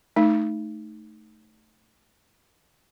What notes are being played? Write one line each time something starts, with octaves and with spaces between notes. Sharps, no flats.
A3 D#4